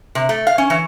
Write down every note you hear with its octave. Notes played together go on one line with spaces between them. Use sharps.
C3
A3
F5
C#4
E3